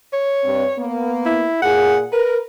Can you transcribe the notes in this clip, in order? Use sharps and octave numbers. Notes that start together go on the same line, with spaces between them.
C#5
G2 C4
A#3 B3
E4
A#2 F4 G#4 F#5
A#4 B4